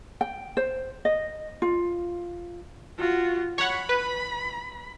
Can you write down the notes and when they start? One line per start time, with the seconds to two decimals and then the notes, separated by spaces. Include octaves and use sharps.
0.21 G5
0.57 C5
1.05 D#5
1.62 F4
2.98 F4 F#4
3.58 C#5 F#5 B5
3.89 B4